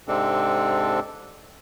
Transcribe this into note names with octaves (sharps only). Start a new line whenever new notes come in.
G#2 C3 G#3 C4 D4 A4